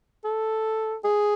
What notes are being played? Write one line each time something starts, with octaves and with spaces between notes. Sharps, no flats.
A4
G#4